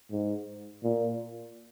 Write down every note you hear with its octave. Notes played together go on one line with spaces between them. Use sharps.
G#2
A#2